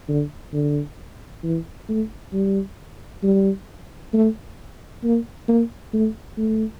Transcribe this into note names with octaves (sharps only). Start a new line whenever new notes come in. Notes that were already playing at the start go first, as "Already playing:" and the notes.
D3
D3
E3
A3
G3
G3
A3
A#3
A#3
A3
A3